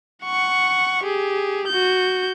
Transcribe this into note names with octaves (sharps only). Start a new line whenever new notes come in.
F#5 C#6
G4 G#4
F#4 G6